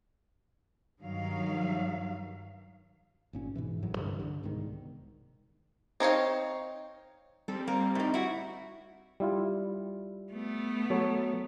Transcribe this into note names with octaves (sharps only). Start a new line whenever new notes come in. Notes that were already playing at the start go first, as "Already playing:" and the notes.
G2 D#3 F#3 F5
G#1 A#2 C#4
G#2 B2 E3
A1 A2 F#3
C2 G2 D3 E3
D3
C2 G#2 B2 D#3
C4 D#4 C#5 F5
G3 C4 A4
A#3
A2 D#4
E4 F#4
G3 E4 F4
A3 B3
F#3 A4 C#5